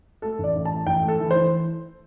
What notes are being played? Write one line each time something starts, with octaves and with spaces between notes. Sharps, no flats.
A3 A4
A1
D5
A1
A5
A3
A1 G5
A3
A4
E3
C5
E3